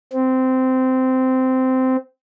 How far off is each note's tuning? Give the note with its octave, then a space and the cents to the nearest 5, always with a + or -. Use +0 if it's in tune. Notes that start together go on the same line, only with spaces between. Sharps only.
C4 -15